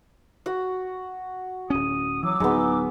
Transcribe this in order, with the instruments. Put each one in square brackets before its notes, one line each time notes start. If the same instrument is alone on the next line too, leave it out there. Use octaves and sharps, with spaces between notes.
[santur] F#4 F#5
[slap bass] D1 C#4 [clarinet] D#6
[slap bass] E3 [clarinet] F#3 [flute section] D6 E6
[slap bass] D1 F#3 [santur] G#3 B3 [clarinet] D#4